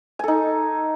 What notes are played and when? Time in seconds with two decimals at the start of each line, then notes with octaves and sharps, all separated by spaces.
0.19 G#5
0.24 A4
0.28 D#4